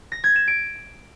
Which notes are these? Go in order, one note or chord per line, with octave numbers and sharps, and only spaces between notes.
A#6
G#6
E7
D7